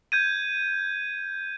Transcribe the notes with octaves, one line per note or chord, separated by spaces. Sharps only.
G6 G#6 D#7